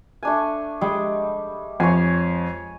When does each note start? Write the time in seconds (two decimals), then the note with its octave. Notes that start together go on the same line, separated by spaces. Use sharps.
0.23 A3 D4 G#5
0.81 G3 G#3
1.80 F2 C#5 G#5